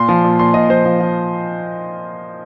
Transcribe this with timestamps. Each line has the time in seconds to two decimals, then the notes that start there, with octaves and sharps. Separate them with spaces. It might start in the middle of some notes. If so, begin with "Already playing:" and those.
Already playing: A#2 C6
0.09 F3
0.24 A#2
0.39 A#2 C6
0.54 A#2 D#5
0.69 F3 C5
0.85 F3
1.00 F3